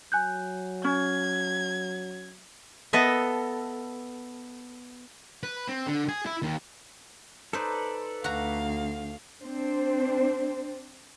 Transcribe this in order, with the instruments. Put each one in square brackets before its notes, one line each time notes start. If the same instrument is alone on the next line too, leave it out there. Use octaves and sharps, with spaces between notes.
[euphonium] F#3 [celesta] G#5 F#6 G6
[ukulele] C#4 [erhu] G#6
[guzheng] B3 A4 D#5 E5
[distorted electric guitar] B4
C4
D3
G#4
E4
D#2
[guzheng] D#4 C5 [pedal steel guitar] A4 B4 D5
[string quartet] D2 F5 [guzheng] F#4 A#5
[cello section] C4 D4 C5